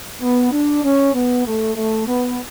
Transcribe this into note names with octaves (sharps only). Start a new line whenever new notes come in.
B3
D4
C#4
B3
A3
A3
B3